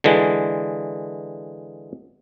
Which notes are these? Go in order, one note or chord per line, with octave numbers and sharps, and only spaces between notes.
D3 E3 G#3